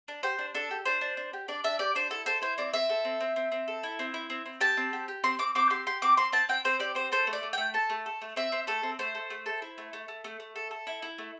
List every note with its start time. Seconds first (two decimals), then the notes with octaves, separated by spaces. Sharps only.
0.08 D4
0.23 G4 C5
0.39 D4
0.55 D4 A4
0.71 G4
0.85 D4 C5
1.01 D4
1.17 D4
1.33 G4
1.48 D4 D5
1.64 D4 E5
1.79 G4 D5
1.95 D4 C5
2.10 E4 A4
2.26 A4 C5
2.42 E4 C5
2.58 C4 D5
2.73 C4 E5
2.89 A4
3.05 C4
3.20 C4
3.36 C4
3.52 C4
3.68 A4
3.83 E4
3.99 C4
4.14 E4
4.30 C4
4.46 C4
4.61 G4 A5
4.77 C4
4.93 G4
5.08 G4
5.24 C4 C6
5.39 C4 D6
5.55 C4 D6
5.70 G4 C6
5.87 G4 C6
6.02 C4 D6
6.17 C4 C6
6.32 C4 A5
6.49 C4 G5
6.65 C4 C5
6.80 G4 D5
6.95 C4 C5
7.12 A4 C5
7.27 A3
7.33 D5
7.43 A3
7.53 A3 G5
7.74 A4 A5
7.90 A3
8.06 A4
8.22 A3
8.36 C4 E5
8.52 C4
8.67 A3 A4
8.83 C4
8.99 A3 C5
9.15 A4
9.30 A3
9.46 A4
9.62 E4
9.78 A3
9.93 A3
10.08 A3
10.24 A3
10.40 A3
10.56 A4
10.71 A4
10.87 E4
11.02 E4
11.18 A3